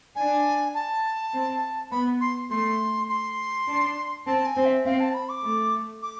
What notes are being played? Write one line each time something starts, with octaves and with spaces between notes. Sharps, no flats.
D4 G#5
A5
C4
B3 B5
C6
A3 C6
C6
D4
C4 A5
G#5
C4
E5
C4 F5
A5
B5
D6
A3
D6